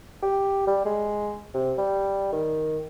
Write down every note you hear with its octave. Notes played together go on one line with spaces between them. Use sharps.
G4
G3
G#3
C3
G3
D#3